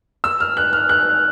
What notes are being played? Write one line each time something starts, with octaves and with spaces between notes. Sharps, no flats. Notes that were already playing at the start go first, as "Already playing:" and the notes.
E6
F6
F#6
F6
F#6